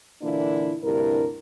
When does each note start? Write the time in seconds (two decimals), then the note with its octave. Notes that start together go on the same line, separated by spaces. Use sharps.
0.22 A#2 D3 E3 A#3 D4 E4
0.83 D2 G2 C3 E4 A#4